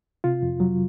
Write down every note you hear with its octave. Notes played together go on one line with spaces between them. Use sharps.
C3 F4
F2
F#3